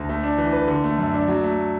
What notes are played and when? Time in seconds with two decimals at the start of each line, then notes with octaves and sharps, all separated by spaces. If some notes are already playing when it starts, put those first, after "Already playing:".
Already playing: D2
0.09 A3
0.23 D4
0.38 E3
0.53 B4
0.68 D3
0.84 A3
0.98 F#2
1.13 D4
1.28 F#3
1.43 A3